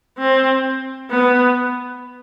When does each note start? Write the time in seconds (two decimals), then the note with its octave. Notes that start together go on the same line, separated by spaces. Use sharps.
0.18 C4
1.11 B3